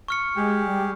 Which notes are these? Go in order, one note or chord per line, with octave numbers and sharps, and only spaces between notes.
C#6 F6 C#7
G#3 G4 G#4
G3